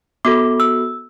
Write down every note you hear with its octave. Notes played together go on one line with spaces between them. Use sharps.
B3 F#4 A4 D6
E6